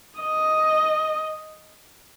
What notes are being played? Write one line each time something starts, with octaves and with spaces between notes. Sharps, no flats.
D#5